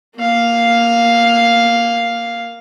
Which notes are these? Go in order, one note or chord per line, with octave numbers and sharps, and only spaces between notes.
A#3 F5